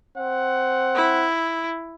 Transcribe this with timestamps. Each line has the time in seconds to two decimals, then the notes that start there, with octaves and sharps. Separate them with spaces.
0.17 C4 F#5
0.96 E4